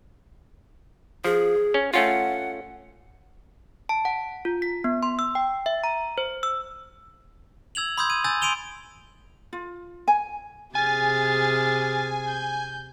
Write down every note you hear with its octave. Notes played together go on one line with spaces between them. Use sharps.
F3 G#4
C#4
A3 C#4 F4 F#5
A5
F#5
F4
B6
B3
C6
E6
G5
E5
A#5
C5
E6
E6 G#6 F7 F#7
B5 C6 D#6 E6 G6 G#6
G#6 D#7
G#5 D#6 E6 G6 A6
C6 D7 D#7 F7 G7
F4
G#5
C3 G#4 G#5 F6 A6
G6